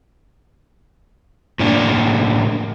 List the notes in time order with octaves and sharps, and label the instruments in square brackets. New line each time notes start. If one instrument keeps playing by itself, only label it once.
[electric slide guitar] A2 A#3 D4